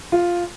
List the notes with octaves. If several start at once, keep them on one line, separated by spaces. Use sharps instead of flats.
F4